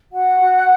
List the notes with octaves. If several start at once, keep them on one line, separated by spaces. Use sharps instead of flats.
F#4 F#5
F#4